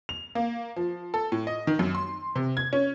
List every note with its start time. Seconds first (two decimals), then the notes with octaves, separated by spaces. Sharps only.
0.09 F7
0.35 A#3
0.76 F3
1.14 A4
1.32 A2
1.47 D#5
1.67 D#3
1.79 F#2
1.95 C6
2.36 C3
2.57 G#6
2.73 C#4